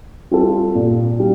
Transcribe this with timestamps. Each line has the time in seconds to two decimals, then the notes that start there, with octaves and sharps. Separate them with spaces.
0.31 G3 C4 F4 A4
0.75 A#2
1.20 G3